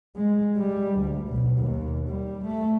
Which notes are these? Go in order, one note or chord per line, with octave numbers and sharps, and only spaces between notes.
G#3
G3
D2
B1
D#2
G3
A3